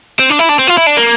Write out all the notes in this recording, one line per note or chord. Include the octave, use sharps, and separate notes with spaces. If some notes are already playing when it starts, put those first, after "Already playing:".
C4
D4
E4
D4
C4
F4
E4
D4
A#3